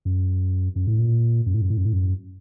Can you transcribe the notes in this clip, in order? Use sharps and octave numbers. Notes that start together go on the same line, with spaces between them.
F#2
F#2
A2
A#2
F#2
A2
F#2
A2
F#2
A2
F#2